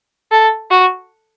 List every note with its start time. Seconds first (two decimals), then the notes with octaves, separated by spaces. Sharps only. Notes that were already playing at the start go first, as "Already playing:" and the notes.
0.32 A4
0.70 F#4